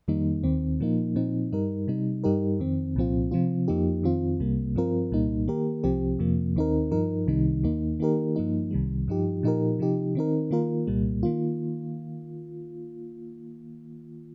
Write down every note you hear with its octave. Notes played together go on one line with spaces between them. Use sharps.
F2 D#3 G3 A#3 D#4
D#2 D#3 C4
A#2 F3 A#3 D#4
A#2 F3 C4 D#4
G2 G3 D#4 A#4
C3 G3 D#4
G2 G3 D#4 G4 A#4
F2 D#3 C4
C2 A#2 F3 C4 F4
C3 F3 C4 F4
F2 F3 A#3 D#4 G4
F2 D#3 C4 F4
C2 C3 G3 A#3
G2 F3 C4 F4 A#4
C2 A#2 G3 A#3 D#4
D#3 A#3 G4 A#4
C2 C3 F3 C4 G4
F2 C3 F3 A#3
D#2 D#3 C4 D#4 A#4
G2 F3 D#4 A#4
C2 C3 D#3 G3 D#4
D#2 D#3 A#3 D#4
D#3 A#3 D#4 G4 A#4
G2 F3 A#3 D#4
C2 C3 D#3 G3
G2 F3 D#4 G4
A#2 F3 D#4 G4 A#4
C3 F3 D#4 G4
D#3 C4 D#4 A#4
D#3 A#3 F4 A#4
C2 A#2 G3 A#3
D#3 A#3 F4